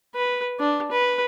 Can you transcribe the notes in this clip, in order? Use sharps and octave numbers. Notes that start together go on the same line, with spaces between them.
B4
D4
B4